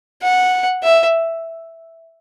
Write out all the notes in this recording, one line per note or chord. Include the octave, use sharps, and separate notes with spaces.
F#5
E5